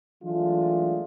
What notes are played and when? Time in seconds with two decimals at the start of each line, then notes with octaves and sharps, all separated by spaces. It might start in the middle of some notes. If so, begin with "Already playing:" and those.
0.23 E3 F#3 G#3 A3 D4 F4